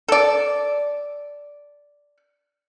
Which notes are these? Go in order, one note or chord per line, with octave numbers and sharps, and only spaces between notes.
A4 D5